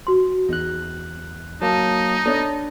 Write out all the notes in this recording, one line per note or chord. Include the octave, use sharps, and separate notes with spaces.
F#4 C6
E2 D#4 F#6
F#3 A#3 D#4 A5
B3 D4 A4 C#5 D#5